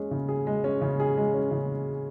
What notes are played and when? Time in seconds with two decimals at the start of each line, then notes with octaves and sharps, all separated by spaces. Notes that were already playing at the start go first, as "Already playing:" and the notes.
Already playing: G#3 C#4 G#4
0.11 C#3
0.28 G#4
0.47 G#3
0.64 C#4
0.81 C#3
1.00 G#4
1.17 G#3
1.34 C#4
1.51 C#3